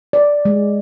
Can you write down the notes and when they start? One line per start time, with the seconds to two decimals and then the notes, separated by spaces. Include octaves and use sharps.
0.13 D5
0.45 G#3